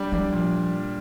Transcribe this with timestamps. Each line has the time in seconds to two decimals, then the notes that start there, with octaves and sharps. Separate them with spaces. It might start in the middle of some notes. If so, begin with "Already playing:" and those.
Already playing: G3 D4
0.12 F3 D4
0.32 A#2